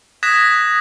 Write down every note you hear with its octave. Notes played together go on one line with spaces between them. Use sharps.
D#6 F#6 G#6 A#6 B6 E7